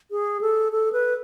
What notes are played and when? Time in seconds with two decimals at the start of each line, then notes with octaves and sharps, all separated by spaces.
0.11 G#4
0.41 A4
0.72 A4
0.92 B4